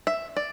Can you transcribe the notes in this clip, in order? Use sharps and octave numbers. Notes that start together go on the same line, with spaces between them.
E5
D5